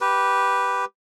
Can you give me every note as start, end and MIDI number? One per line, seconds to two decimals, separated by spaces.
0.01 0.85 67
0.01 0.85 71